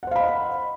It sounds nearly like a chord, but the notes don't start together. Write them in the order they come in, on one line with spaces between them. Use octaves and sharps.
F#5 C5 F5 B5 D#5